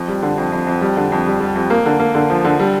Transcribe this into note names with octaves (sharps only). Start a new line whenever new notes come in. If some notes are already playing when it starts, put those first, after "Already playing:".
Already playing: F2
G3
D3
F2
F2
F2
G3
D3
F2
G3
G3
F2
A#3
D3
A#3
D3
F3
D3
G3